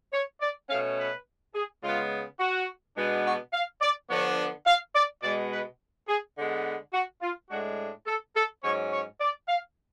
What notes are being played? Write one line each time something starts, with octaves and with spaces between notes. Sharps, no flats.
C#5
D5
B2 A3 C#4 F5
B4
G#4
C#3 G#3 B3 F4
F#4
B2 G#3 B3 D4
F#4
F5
D5
D3 F3 B3 D4 C#5
F5
D5
B2 G#3 B3 D5
B4
G#4
D3 G#3 B3
F#4
F4
A2 G#3 D4 F#4
A4
A4
G#2 F#3 C#4 C#5
C#5
D5
F5